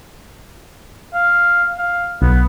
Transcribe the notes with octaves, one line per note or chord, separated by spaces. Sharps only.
F5
F5
B1 B3